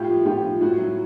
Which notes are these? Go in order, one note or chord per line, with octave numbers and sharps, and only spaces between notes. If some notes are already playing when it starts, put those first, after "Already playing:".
Already playing: A2 F4 G4
F3
A2 F4 G4
F3
A2 E4 F#4
F#3